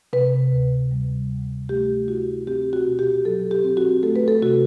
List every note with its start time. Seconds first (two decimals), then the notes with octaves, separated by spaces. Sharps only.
0.13 C3 B4
0.52 D2
0.91 G3
1.30 D2
1.69 A3 G4
2.08 E4 F#4
2.47 C4 G4
2.73 F#4
2.86 B2
2.99 G4
3.25 F#3 A4
3.51 G4
3.64 C4
3.77 F#4
4.03 A3 A4
4.16 B4
4.28 A4
4.42 C3 F#4